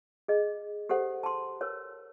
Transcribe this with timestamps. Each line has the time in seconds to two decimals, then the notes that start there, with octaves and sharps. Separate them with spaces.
0.28 G#4 D#5
0.89 G4 A4 C5 F#5
1.23 A5 C6
1.61 A#4 B4 C#5